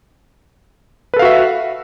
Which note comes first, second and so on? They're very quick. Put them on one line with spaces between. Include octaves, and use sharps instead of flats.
B4 A4 F5 F#4 E5